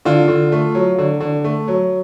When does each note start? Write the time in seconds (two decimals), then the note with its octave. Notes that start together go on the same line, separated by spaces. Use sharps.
0.05 D3 F4
0.28 D3
0.52 A3
0.75 F#3
0.98 D3
1.20 D3
1.44 A3
1.68 F#3